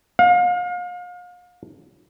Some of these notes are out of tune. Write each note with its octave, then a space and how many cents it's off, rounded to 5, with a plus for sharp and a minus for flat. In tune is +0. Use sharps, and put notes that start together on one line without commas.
F5 +35